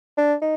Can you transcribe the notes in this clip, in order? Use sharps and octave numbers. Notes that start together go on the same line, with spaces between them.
D4
D#4